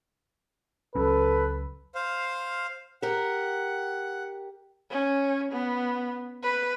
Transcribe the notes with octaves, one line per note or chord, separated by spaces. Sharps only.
C#2 F#3 C#4 A4 B4
C5 F5
G4 A#4 F#5
C#4
B3
B4